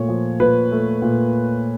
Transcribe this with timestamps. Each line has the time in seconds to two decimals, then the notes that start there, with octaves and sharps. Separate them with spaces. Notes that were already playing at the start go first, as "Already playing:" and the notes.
Already playing: A#2 A3 C#5
0.08 F3
0.40 A#2 B4
0.71 A3
1.02 A#2